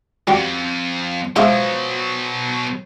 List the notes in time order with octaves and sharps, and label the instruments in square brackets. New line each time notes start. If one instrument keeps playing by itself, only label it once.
[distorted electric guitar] F2 [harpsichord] G3 F#4 G4
[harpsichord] G#2 E5 C#6 [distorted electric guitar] B2 F#3 [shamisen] F3